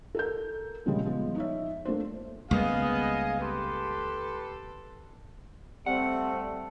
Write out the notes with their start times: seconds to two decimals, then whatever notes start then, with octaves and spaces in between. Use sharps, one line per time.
0.15 A4 A#4 G6
0.86 A#2 C#3 F3 G3 G#3
1.05 F3 G#3 B3
1.36 D#4 C#5 E5
1.85 A3 A#3 D4 C5
2.51 C#2 G3 A#3 B3 G#4 D#5 F5
3.40 G4 A4 B4 C6
5.86 G3 A3 C4 F#5